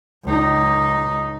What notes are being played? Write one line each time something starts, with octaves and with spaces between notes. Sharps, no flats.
C#2 D#4